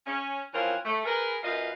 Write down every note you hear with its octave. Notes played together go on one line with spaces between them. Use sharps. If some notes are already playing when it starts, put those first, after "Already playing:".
C#4
E3 F3 C4 C#4 F4 A#4
A3
G#4 A#4 B4
F#2 A#2 F4 B4 D#5 F5